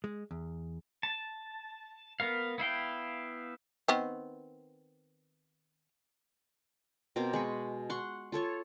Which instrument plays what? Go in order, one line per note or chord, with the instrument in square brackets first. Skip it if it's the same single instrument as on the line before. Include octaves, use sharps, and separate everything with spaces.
[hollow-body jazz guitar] G#3
E2
[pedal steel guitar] A5
B3 A#4 F5
B3 E4 F5 G5
[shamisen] D#3 B3 C4
[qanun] B2 C4 A#4 D6
G#3 B5 C#6
F#5 C6 C#6
F4 A4 C#5 C#6